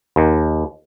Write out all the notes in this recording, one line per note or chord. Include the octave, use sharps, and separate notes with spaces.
D#2